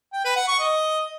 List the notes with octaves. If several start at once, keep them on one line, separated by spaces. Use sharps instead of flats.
G5
B4
F#5
C#6
D#5